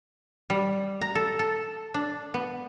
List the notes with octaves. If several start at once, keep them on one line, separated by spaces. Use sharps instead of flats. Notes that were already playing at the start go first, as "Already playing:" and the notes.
G3
A#5
A4
A4
D4
B3